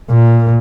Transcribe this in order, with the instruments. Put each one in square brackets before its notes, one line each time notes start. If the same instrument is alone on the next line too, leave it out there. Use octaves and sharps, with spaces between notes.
[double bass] A#2